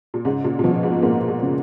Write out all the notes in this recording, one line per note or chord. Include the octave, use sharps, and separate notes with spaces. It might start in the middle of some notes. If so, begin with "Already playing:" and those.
A#2
G#2 C#3
A#2
A#2
B2 F3
G#2
G#2 A#3
A#2
C#3